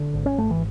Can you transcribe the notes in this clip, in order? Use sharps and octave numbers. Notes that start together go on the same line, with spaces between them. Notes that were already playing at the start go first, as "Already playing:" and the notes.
Already playing: D3
G#1
C#4
G#1 A3
E3